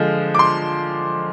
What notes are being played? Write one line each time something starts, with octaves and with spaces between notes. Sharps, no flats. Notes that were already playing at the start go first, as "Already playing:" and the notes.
Already playing: D3 F3 G#3
D6
C6